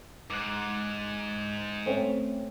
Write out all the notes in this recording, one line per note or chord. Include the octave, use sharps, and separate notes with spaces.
G#2 D6 F#6
A3 C4 C#4